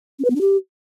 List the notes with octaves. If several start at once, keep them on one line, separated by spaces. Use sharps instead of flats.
C#4
B4
B3
D4
G4